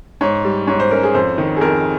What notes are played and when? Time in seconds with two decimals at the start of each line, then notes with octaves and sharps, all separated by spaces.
0.21 G#2 C#5
0.45 G3
0.67 G#2 C#5
0.80 C5
0.91 C#4 A#4
1.03 G#4
1.14 F2 C5
1.38 D#3
1.57 G#4
1.61 F2 A#4